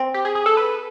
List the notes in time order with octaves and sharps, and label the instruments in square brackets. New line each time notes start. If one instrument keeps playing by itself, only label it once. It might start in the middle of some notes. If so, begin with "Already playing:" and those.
Already playing: [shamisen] C4
[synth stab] G4
G#4
G#4
A4
B4